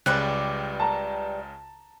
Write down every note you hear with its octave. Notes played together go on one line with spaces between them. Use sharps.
C#2 C#3 G3 B4 D5 F#6
A5 A#5